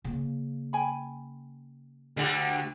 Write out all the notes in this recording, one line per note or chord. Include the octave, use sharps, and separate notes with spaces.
C#3 A#3
G5 G#5 B5
D2 D3 G3